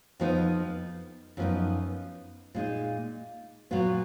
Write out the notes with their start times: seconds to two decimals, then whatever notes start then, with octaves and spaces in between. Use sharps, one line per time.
0.20 F2 F3 B3 D#4
1.37 F#2 F3 G#3 B3 D#4
2.55 A#2 G#3 D#4
3.71 A#2 F#3 B3 F4